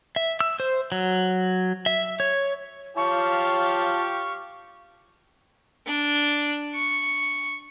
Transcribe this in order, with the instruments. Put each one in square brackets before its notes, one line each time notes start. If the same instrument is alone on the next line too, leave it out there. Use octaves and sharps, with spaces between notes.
[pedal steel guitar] E5
E6
C5
F#3
E5
C#5
[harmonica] F4 A5 [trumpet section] G4 F5 [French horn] C#5 [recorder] C#6
[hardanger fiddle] D4
C#6